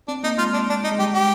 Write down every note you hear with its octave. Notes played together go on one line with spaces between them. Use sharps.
C4 D4
A#3 D#4
G#3 F4
D4
D4
D#4
G#3
G3 G4
G4